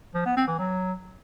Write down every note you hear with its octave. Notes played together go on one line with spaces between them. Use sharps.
F3
B3
C4
E3
F#3